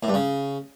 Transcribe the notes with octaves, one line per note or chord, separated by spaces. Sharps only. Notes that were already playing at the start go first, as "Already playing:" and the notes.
A2
G2
C#3